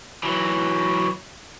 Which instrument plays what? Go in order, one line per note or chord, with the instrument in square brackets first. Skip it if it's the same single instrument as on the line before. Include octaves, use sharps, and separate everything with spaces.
[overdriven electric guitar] E3 F#3